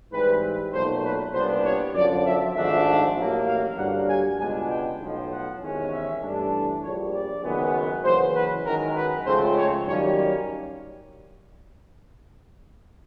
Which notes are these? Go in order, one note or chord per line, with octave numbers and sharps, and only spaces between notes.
G#2 E3 G3 C4 B4
B1 A#2 F#3 A3 C5
B4
C2 A#2 G3 B3 D4 C5
C#5
F#2 D3 F3 D5
E5
G#1 G#2 F3 A3 D4 E5
A1 A2 F#3 A#3
F5
G2 D3 F#3 A#3 F#5
G#5
C#2 B2 G#3 B3 D4 G#5
G5
B1 A2 F3
F#5
E2 C3 D#3 G#3 C#4
E5
G2 E3 A3 D4
A#1 A#2 G3 C#5
D5
F#1 F#2 D#3 G#3 B3
F#1 F#2 C#3 E3 C5
B4
F#2 D#3 G#3 A#4
B4
C#2 C#3 F3 A3 C4 C5
C#5
F#2 D#3 G3 A#3 C#4 C#5